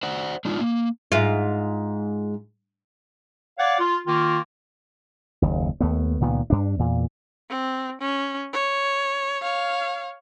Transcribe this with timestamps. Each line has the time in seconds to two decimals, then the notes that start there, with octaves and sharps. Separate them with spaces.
0.03 C5 D5 F#5
0.45 G#3 D4 D#4 F4
0.60 A#3
1.12 G#2 F4
3.58 C#5 D5 F5 F#5
3.78 F4
4.05 D#3 A#3 F4
5.42 F#1 D#2
5.81 D#2 A3 B3
6.21 C#2 A#2 D#3 B3
6.50 G2 D4
6.79 E2 A#2
7.50 C4
8.01 C#4
8.53 C#5
9.41 C#5 F5